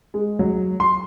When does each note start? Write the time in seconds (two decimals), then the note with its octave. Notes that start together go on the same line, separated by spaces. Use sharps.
0.14 G#3
0.39 F#3
0.80 C6